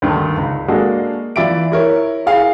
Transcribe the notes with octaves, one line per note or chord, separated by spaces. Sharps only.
D2 G2 D3 D#3
C#2
G#3 A#3 D4 F#4 G#4 A4
E3 F4 D5 E5 D7
E4 A#4 C#5 E5
E4 G#4 F5